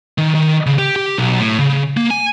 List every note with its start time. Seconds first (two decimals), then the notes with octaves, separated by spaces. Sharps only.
0.18 D#3
0.35 D#3
0.66 C#3
0.79 G4
0.96 G4
1.18 B1
1.40 A2
1.59 C#3
1.97 A#3
2.11 G#5